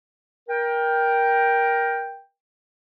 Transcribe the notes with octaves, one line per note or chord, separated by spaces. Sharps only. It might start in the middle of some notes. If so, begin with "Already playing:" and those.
A#4 G5